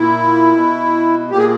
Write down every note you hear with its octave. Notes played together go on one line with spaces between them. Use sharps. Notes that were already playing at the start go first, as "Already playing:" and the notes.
Already playing: A#2 E4
B2
A#2 G4
G#4